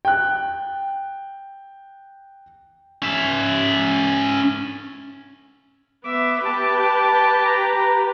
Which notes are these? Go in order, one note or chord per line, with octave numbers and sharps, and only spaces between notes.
G5 F#6
C#4 E5
B3 E5 D6
G4 B4 A5
A#5